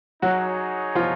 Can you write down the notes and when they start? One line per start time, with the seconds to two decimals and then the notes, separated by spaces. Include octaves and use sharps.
0.22 F#3 D#4 F#4 G#4 C#5
0.95 F3 F4